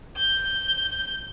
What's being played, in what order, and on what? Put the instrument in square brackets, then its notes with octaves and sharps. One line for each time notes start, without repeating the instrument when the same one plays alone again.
[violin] G6